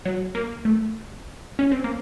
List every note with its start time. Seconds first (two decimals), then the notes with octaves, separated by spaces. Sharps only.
0.05 F#3
0.35 A#3
0.65 A3
1.59 C#4
1.72 C4
1.84 A#3